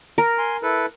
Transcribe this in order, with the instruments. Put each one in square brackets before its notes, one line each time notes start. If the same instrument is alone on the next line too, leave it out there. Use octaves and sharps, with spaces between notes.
[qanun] A#4
[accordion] G#5 C6
E4 A4 B4